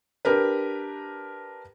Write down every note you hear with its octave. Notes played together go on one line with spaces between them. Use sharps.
D4 G4 A#4 B4